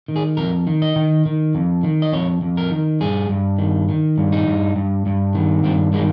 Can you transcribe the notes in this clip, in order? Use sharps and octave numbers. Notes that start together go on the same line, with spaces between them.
D#3
G#4
F2 A#4
D#3
D#5
D#3
D#3
F2
D#3
D#5
F2 C#5
F2
A#4
D#3
G2 G#4
G2
D#3
D#3
G2
D#4
G2
G2
G2
D#3
G2 C4
D#3 G#3